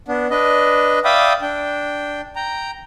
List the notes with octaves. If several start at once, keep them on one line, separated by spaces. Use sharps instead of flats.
B3 D4
D4 B4 D#5
D5 E5 F5 G5 B5 D#6
D4 G5
G5 A#5